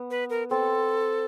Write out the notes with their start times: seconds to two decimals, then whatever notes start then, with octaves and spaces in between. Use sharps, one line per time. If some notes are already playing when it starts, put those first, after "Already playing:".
Already playing: B3
0.10 B4
0.30 A#4
0.50 C4 A4